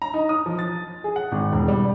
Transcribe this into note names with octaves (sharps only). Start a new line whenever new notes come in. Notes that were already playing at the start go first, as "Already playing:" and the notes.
A#5
D#4
D#6
F3
A6
G#4
F#5
G#1
E1
G3